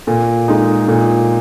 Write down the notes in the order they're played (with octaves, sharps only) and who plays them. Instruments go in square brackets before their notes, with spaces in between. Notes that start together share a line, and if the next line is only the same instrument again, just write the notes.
[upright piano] A#2
G#3 D#4
A#2